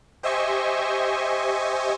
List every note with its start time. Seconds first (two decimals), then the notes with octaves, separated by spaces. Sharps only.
0.23 G4 C5 D#5 E5 G#5 C#6